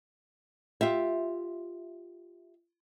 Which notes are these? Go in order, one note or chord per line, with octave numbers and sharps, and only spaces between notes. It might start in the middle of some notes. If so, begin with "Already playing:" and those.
F4 G4 E5